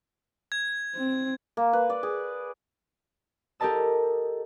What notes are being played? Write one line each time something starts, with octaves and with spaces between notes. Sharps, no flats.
G#6
C4
A#3
B4
D5
G#4
G4 A4 A#4 D#5 A5 E6